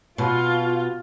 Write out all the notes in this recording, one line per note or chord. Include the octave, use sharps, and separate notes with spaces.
B2 F4